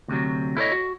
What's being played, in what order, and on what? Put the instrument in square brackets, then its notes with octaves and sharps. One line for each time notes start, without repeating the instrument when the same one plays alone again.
[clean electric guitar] D2 C3 F#3
E4 A4 A#4 C5 C#5 D#5
F#4